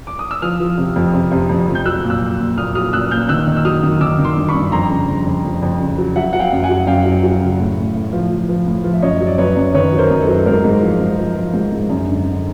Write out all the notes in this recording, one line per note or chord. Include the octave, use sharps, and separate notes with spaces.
D6
D#6
E6
F3 D#6 F6
F3
C3
F2
C3
C3
F2
F2
G6
F#3 E6 F#6
A#2
E6 F#6
F#3
A#2
A#2 D#6 F6
F#3 D#6 F6
A#2 E6 F#6
A#2 F6 G6
D#3 E6 F#6
D#3
E6
F#3 D#6 F6
D#3
D#3 D6 E6
D#3
C6 D6
G2
B5 C#6
G2
F2 A#5 C6
C#3
F2
F2
F2
F2
C#3
F#3
F#3 E5 F#5
F#3 F#5
F5 G5
F#2
F#5 G#5
F#3
F#2 F5 G5
F#3
F#3
C#3
A2
A2
A2
F3
F3
F3
A2
F3
E5
F#2 C#5 D#5
F#3
D5
F#2 B4 C#5
F#2
D#3 B4 C#5
F#3
A#4 C5
F#2
A4 B4
F#3
G#2 A#4 C5
G#2
F3
G#2
F3
F3
G#2
G#2
F#2
D3
D3